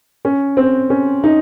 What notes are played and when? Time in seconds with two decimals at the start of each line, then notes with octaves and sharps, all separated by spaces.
0.25 C#4
0.57 C4
0.90 C#4
1.24 D#4